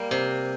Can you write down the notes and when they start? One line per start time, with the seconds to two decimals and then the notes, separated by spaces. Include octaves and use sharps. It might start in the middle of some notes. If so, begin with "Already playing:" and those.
Already playing: G3 A#3
0.11 C3